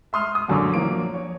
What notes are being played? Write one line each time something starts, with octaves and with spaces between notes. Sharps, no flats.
E5 C6 D#6 F6
D#6
A#1 F#2 D3 C#6 D6
F3 F#3 A#3 D7
C#5